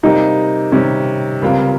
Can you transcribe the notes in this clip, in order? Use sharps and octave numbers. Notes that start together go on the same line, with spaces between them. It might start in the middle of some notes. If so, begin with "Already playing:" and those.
C3 G3 A#3 D#4
C3 D#3 G3 C#4
C#2 C#3 G3 A#3 C4 F4